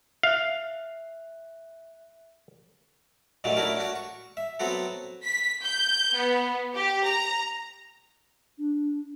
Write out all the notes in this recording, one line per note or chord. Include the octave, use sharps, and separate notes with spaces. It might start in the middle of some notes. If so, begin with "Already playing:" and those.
E5 F5 F#6
D#2 A#2 D#3 F#3 A3 D4
A3 C#4 D4 E4 F#4 A#4
D4 F#4
C#6
E5
F#3 B3 C4 F#4 A4
B6
G6
B3
G4
A#5
D4